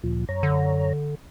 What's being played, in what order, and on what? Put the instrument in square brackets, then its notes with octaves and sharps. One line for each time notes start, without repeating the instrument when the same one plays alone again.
[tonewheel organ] D2 A#2 F3
F#2 C#5 A#5
[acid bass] D3